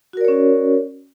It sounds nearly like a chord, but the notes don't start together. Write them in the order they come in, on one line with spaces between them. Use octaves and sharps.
F#4 A#4 D5 C#5 C#4